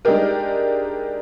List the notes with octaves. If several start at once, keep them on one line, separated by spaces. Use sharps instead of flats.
G#3 D4 D#4 G4 A#4